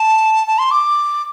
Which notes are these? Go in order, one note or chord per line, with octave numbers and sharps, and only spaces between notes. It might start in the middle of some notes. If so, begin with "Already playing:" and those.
Already playing: A5
A5
C6
D6